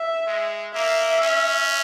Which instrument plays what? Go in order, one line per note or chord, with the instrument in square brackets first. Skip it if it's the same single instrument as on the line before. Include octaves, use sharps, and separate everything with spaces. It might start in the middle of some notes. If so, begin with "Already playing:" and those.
Already playing: [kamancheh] E5
[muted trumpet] G#3
[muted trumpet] A#3 [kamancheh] E5
[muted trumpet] C#4